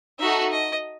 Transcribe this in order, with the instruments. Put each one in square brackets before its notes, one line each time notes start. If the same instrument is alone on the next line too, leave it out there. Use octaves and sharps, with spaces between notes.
[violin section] D#4 F#4 A4 [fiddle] E5
[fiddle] D#5